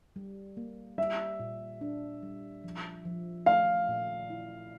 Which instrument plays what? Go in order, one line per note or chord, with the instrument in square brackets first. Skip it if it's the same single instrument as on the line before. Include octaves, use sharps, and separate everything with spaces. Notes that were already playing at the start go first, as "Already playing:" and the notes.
[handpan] G3
A#3
[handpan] G3 [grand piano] E5
[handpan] A#2
D4
G3
F3
F3
[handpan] A3 [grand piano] F5
[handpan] A#2
E4